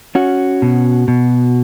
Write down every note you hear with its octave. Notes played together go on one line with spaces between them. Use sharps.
C#4 F#4
B2
B2